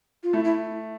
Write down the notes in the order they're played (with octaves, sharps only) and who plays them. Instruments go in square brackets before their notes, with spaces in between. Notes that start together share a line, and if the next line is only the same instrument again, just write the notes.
[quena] F4
[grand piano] A3 [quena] E4
[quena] E4